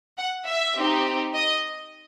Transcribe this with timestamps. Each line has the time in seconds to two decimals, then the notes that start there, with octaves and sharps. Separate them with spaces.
0.17 F#5
0.46 E5
0.76 C4 D#4 G4
1.35 D#5